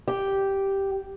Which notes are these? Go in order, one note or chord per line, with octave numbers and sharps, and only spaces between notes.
G4